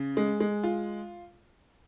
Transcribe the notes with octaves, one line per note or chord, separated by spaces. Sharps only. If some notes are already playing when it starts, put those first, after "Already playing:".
Already playing: C#3
G#3
G#3
F4